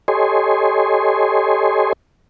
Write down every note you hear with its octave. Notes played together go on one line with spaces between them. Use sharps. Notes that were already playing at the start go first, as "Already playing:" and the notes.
G4 A4 C#5 D#5 G#5 C6